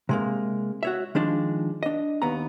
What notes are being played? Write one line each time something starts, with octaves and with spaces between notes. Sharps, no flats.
C3 G#3 A#3
F#4 C#5 E5
D#3 F3 G#3 D4
D4 D#5
D#2 B3 A#5